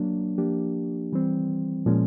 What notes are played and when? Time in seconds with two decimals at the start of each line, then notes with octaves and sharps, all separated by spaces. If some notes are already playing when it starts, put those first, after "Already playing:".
Already playing: F#3 A#3 D4
0.38 F3 A#3 D4 G4
1.13 E3 G3 C4
1.86 A#2 F3 G#3 C#4